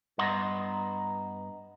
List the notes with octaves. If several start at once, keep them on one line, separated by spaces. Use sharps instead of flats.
G2 B3 D#5 A#5 C6